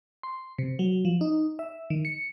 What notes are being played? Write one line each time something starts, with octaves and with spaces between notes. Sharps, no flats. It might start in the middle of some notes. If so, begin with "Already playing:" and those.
C6
C3
F#3
F3
D#4
E5
D#3
C#7